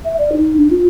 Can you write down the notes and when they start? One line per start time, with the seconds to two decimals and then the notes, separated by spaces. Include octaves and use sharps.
0.05 E5
0.19 D5
0.33 D#4
0.57 D4
0.71 F4